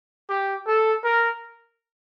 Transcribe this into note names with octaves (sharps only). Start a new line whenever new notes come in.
G4
A4
A#4